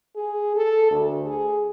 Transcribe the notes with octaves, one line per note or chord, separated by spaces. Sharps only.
G#4
A4
D2
G#4